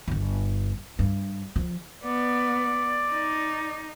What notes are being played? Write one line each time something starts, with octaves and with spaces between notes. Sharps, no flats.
G1 G2
G2
F3
B3 D5
D#4